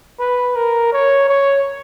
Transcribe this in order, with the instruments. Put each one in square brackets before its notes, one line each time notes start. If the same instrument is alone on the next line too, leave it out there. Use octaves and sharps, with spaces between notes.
[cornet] B4
A#4
C#5
C#5